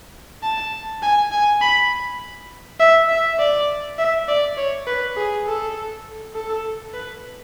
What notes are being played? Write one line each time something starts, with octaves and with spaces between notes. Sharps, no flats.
A5
G#5
G#5
B5
E5
E5
D5
E5
D5
C#5
B4
G#4
A4
A4
B4